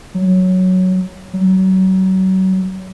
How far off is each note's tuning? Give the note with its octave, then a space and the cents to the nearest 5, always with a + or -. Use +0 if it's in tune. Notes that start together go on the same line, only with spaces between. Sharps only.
F#3 +0
F#3 +30